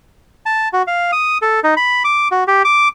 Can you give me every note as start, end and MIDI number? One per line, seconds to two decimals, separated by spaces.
0.46 0.68 81
0.73 0.82 66
0.87 1.11 77
1.12 1.38 87
1.42 1.60 69
1.64 1.74 63
1.77 2.03 83
2.05 2.28 86
2.31 2.44 66
2.48 2.63 67
2.65 2.88 86